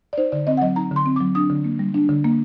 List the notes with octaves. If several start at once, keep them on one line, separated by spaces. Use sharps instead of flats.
D5
D#4 C5
D3 D5
C4 D#5
F#5
F#3 D#5
D#4 A#5
D3 C6
C4
F#3 D6
D4 D#6
D3
A#3
G3
D4
D3
A#3